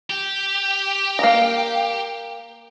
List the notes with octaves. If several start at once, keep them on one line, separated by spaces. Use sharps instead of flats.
G4
A#3 A#5